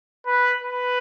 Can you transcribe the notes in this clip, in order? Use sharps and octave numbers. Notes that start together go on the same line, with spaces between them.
B4
B4